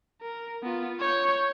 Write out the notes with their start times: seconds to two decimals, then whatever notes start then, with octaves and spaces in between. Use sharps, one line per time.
0.22 A#4
0.63 B3 F4
1.00 C#5 G6